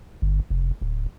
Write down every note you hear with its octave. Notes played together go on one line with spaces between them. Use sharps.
G1
F1
D1